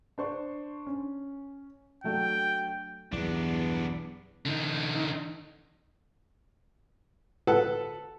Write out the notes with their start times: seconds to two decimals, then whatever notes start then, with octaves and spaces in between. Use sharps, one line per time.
0.18 D4 C5 C#6
0.87 C#4
2.04 F#3 A3 D4 G5
3.12 B1 E2 G2 B3 D4
4.46 D3 D#4
7.47 A4 B4 F#5 A5